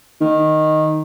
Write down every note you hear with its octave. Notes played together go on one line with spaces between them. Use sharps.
D#3